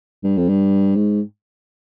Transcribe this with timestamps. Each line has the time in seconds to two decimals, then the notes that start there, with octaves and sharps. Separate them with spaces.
0.24 G2
0.37 F2
0.48 G2
0.95 G#2